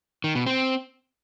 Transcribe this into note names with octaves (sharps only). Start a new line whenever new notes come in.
D#3
B2
C4